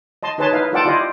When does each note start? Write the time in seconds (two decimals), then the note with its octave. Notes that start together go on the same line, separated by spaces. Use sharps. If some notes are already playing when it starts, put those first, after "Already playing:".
0.23 D#5 A5 C6
0.38 D#4 G#4 B4 C#5 A5 C6
0.52 D#4 E4 B4 F5
0.73 F4 A4 D5 F#5 G5 A5
0.85 E4 F4 G4 D5 D#5